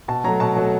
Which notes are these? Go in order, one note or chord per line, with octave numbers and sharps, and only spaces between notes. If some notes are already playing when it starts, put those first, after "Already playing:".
B2 A5
F#3 A3 A#5
B2 A5
F#3 A3